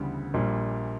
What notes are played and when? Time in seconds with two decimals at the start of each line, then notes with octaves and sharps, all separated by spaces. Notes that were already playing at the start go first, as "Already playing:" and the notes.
Already playing: D2 C#3 E3 G3 B3
0.34 A#1 A#2 G3